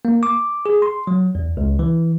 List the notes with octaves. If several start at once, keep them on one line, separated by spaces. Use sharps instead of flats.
A#3
D6
G#4
C6
F#3
E2
C#2
E3